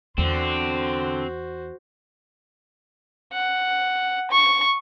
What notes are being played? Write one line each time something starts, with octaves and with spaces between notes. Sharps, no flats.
E2 D3 C4 F#4 C5
F#5
C#6